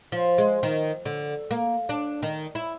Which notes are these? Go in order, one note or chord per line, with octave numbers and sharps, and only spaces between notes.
F3
G#3
D#3
D3
A#3
D4
D#3
E4